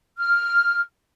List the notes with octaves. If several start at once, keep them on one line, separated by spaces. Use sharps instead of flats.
F6